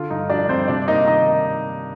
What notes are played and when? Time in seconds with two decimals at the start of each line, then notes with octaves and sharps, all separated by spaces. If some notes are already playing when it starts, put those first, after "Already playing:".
Already playing: D3 F4
0.10 G2 D#4
0.29 F3 D4 D5
0.49 G2 C4 C5
0.68 C3 D4 D5
0.88 A#3 D#4 D#5
1.06 D#3 D#4 D#5